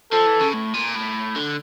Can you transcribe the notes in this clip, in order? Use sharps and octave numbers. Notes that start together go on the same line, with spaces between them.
F3 A4
E3
C#3
A2
A#2
A2
D3